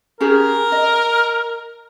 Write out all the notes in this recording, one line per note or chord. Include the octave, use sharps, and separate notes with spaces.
C#4 G4 G#4 A#4
D#5